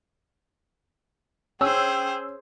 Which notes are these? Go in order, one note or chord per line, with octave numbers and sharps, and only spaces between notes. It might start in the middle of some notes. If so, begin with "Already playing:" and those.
C#4 G#4 C5 G5 E6